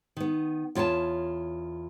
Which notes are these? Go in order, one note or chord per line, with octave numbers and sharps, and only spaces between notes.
D#3 B3
E2 F4 C#5 G5 A5